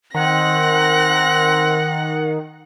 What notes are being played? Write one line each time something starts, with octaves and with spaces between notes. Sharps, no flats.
D#3 C4 F#5 F#6 A#6